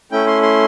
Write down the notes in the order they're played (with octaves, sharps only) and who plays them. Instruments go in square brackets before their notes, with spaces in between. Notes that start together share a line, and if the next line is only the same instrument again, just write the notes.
[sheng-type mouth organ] A3 C#4 E4 G5
C6
C6